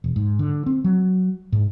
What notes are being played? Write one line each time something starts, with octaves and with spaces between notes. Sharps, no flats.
E1
G#2
D3
C4
F#3
G#2